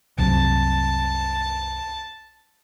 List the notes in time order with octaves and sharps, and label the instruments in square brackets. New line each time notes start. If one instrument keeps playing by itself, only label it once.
[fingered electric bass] C2 F#2 C3 [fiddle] A5